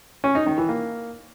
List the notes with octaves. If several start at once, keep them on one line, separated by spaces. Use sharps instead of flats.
C#4
D#4
D#3
E3
A#3